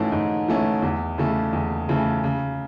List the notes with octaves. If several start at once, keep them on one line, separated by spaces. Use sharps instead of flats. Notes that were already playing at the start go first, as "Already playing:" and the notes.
Already playing: G#2 E3 A3 C#4
G#2
E3 A3 C#4
E2
C#3 E3 A3
E2
C#3 E3 A3
C#3